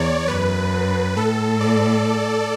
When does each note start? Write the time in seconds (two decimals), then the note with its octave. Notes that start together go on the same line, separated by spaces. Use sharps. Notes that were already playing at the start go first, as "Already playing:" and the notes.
Already playing: E2 C#5 D5
0.28 F#2 B4
1.17 A2 A4
1.60 D5